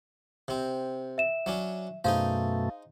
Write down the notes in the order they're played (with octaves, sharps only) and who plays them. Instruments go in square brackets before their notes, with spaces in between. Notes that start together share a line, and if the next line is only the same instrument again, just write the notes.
[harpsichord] C3 C4
[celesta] E5 E7
[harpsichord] F#3 C#4 D4
[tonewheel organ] F#2 B2 A3 [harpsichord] D#4 G#4 C5 [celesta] F5